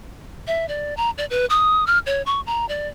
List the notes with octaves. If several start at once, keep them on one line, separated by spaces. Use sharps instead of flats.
E5
D5
A#5
D5
B4
D#6
F6
C#5
C#6
A#5
D5